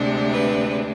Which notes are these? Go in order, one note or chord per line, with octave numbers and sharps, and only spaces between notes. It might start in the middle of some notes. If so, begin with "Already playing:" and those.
Already playing: D2 C3 G#3 D4
B4